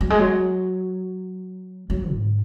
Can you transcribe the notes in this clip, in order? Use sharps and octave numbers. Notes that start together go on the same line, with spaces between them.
F#3
G#3
F#3
F#3
G#2